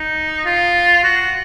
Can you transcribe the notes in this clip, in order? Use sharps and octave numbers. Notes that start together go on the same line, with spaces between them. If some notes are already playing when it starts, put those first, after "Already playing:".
Already playing: D#4
F4
F#4